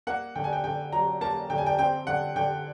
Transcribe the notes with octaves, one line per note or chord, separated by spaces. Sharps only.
A#3 F#5
D3 G5
G#5
G5
D3 G5
F#3 A#5
A#3 A5
D3 G5
G#5
G5
C4 G5
D3 F#5
D3 G5